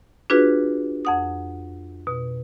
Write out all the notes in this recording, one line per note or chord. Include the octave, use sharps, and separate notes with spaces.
D4 F4 F#4 G#4 B4
F2 F#5 D#6
B2